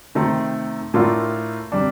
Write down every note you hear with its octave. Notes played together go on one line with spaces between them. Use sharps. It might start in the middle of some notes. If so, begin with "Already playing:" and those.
C3 D#3 A3 C4
A2 A3 D4 F4 A#4
C3 G3 D4